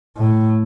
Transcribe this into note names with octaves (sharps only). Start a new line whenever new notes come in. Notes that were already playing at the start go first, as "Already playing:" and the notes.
A2